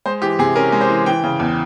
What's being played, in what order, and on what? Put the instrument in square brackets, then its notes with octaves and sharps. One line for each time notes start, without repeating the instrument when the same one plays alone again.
[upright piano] G#3 C5
E3 G4
C3 G#4
C#4 A#4
G#3
C5
E3
E3 G5
C#3
E2